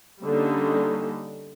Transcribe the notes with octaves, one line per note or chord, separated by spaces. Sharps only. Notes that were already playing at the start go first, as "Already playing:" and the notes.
D3 G3 A#3 C#4 D#4